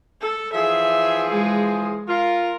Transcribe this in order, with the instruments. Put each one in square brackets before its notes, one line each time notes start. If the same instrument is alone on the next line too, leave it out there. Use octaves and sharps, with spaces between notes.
[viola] A4
[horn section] E3 F3 G#4 [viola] E5
[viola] G#3
[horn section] F4 [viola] A#4